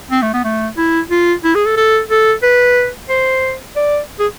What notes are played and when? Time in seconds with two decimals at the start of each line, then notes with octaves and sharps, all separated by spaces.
0.11 C4
0.22 A3
0.33 B3
0.44 A3
0.77 E4
1.10 F4
1.44 E4
1.55 G#4
1.66 A4
1.77 A4
2.10 A4
2.43 B4
3.09 C5
3.76 D5
4.19 G#4